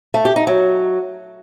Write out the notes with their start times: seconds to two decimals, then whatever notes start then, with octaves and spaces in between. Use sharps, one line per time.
0.14 A3
0.25 G4
0.36 D#4
0.47 F#3